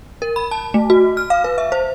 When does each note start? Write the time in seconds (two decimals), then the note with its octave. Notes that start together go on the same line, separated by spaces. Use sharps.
0.22 A#4
0.36 B5
0.51 A5
0.74 A3
0.90 F#4
1.17 F6
1.30 F5
1.44 B4
1.58 E5
1.72 C5